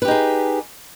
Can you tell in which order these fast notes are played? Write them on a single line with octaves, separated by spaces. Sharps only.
B4 G4 D#4 G#4